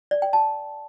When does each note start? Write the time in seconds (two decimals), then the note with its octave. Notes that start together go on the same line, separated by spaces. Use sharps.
0.11 D5
0.22 G5
0.33 A5